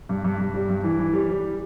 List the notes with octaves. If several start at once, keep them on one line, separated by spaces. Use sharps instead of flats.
G2
G2
G2
G3
G2
E3
E3
G3
G3